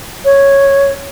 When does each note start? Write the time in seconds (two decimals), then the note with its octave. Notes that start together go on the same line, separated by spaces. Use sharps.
0.25 C#5